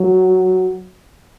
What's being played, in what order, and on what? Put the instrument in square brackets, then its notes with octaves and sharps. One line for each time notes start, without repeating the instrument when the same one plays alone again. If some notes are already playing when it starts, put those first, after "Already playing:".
Already playing: [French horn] F#3